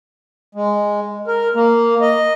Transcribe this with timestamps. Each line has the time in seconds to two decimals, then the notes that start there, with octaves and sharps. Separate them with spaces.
0.55 G#3
1.27 A#4
1.55 A#3
2.01 D#5